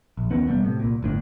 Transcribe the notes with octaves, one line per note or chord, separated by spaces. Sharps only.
A#1
D#2 D#3 B3 C#4
E1 G#2 G3 B3
A2 C3
C2 A#2
G1 A2 D4